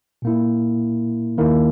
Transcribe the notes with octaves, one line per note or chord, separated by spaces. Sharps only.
A#2 A#3 E4
D#2 D#3 A#3 E4 A#4